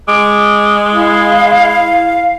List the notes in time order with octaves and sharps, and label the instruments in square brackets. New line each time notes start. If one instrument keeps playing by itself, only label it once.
[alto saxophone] G#3 [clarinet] D6
[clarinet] E4 [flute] F5